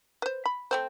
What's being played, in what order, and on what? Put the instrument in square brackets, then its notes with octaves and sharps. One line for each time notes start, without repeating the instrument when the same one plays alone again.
[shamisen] B4 C5
B5
A3 C4 C5